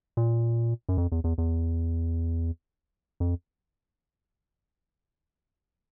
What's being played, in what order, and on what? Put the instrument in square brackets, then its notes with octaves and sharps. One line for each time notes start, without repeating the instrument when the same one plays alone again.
[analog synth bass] A#2
F#2
F2
E2
E2
E2
F2